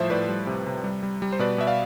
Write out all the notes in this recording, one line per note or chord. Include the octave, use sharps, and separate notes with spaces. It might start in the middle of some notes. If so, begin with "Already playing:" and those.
Already playing: A2 F3 G3 C5 E5
A2 B4 D5
G3
C3
C3
G3
G3
G3
C5
B2 B4 D5
B2 E5
D5 F5